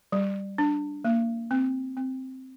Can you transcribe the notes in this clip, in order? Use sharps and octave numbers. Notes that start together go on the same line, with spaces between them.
G3
D4
A#3
C4
C4